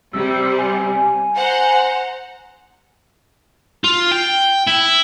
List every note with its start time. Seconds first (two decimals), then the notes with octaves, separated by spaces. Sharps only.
0.13 C3 G3 E6
0.58 G#5
1.35 C5 F#5 A#5
3.84 F4
4.12 G5
4.67 E4